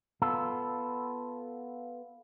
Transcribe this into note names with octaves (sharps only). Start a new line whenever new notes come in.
B3 F4 A4